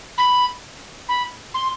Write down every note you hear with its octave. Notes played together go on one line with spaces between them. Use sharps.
B5
B5
C6